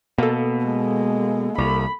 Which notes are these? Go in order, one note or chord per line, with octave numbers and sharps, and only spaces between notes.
B2 A#3 A4
G#3
C2 B5